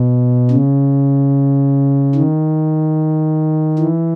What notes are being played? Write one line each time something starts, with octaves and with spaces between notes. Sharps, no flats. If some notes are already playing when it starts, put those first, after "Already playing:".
Already playing: B2
C#3
D#3
E3